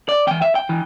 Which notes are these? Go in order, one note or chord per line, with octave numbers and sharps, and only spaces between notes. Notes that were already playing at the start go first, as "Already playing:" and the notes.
D5
E2 E3 G5
E5
G5
E3